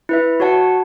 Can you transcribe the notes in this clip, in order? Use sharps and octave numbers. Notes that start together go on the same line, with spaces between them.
E4 B4 E5
F#4 C#5 F#5 A5